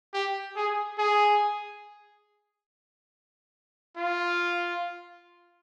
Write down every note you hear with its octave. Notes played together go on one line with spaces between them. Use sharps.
G4
G#4
G#4
F4